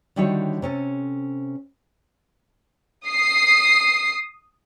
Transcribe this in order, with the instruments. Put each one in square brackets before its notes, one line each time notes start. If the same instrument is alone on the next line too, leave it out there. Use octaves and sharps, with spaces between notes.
[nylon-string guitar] D3 D#3 G3 E4 F#4 C#5
C3 C#4 A4
[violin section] D#6 C7